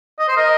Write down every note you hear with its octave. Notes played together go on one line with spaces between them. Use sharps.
D#5
C5
A#4 D#5